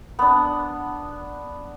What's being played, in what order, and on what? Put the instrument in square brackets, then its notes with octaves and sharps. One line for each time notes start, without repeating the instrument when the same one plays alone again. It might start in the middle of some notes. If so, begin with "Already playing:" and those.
[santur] B3 D4